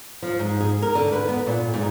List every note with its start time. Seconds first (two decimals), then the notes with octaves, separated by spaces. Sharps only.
0.22 F3
0.39 G#2
0.61 G#4
0.82 A#4
0.95 D3
1.13 B4
1.29 B3
1.47 A#2
1.74 G#2